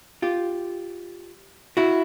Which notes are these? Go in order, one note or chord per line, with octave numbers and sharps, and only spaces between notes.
F4 G4
E4 F#4